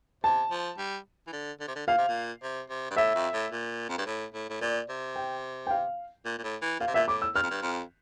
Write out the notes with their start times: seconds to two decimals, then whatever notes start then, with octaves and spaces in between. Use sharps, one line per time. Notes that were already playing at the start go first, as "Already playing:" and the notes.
0.24 C3 A5
0.51 F3
0.78 G3
1.27 E3
1.33 D3
1.60 D3
1.68 C3
1.76 D3
1.87 A#2 F5
1.98 C3
2.08 A#2
2.42 C3
2.70 C3
2.90 G2
2.96 A2 E5
3.15 F2
3.33 A2
3.52 A#2
3.89 F2
3.98 G2
4.06 A2
4.34 A2
4.49 A2
4.61 A#2 D5
4.89 C3
5.16 G5
5.67 G5
5.71 F5
6.26 A#2
6.38 A#2
6.44 A2
6.62 E3
6.80 A#2 F5
6.87 C3
6.94 A#2 E5
7.08 A2 D6
7.22 E6
7.35 G2 F6
7.43 F2
7.51 G2
7.62 F2